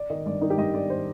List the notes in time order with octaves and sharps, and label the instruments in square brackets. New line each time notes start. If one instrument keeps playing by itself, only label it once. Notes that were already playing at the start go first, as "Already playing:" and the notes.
Already playing: [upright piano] D5
D#3 D#5
G2 D5
D#3 D#4
G4
G2 D#5
D#3 D5
C5